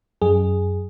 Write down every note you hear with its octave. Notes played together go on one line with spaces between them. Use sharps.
F#2 G#4